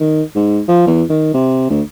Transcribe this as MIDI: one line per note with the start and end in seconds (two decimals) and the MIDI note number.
0.01 0.23 51
0.36 0.61 44
0.68 0.83 53
0.87 1.03 40
1.10 1.31 51
1.34 1.66 48
1.70 1.82 38